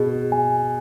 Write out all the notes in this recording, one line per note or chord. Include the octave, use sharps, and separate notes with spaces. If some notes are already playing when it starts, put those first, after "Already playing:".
Already playing: B2 G#4
G#5